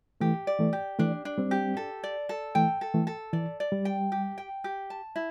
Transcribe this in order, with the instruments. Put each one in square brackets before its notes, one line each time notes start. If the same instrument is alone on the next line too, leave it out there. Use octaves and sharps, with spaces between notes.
[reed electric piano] E3 A3 [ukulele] G4
[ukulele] D5
[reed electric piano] E3 A3
[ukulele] G4
[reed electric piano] E3 A3 [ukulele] D4
[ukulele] D4
[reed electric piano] G3 C4
[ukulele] G4
A4
D5
A4
[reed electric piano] E3 A3 [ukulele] G5
[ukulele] A4
[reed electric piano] E3 A3
[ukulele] A4
[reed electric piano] E3 [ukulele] D5
[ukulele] D5
[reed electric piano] G3
[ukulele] G5
G4
G5
G4
A5
E4